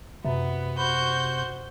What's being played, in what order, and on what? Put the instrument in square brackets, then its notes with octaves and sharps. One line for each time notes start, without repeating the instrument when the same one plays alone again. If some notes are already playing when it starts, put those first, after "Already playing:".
[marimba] F#2 E5 [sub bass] C3 [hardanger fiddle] B3
[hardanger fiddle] F#4 C5 [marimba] B5 [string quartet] G6